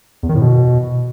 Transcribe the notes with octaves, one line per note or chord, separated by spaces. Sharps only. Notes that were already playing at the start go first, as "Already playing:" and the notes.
E2
D#3
A2
B2